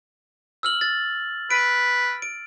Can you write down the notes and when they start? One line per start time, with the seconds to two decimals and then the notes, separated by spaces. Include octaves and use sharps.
0.63 E6 F6 F#7
0.81 A6
1.51 B4 D7
2.22 D7